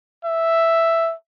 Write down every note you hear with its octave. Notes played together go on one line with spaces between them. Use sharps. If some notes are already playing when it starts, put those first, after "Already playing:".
E5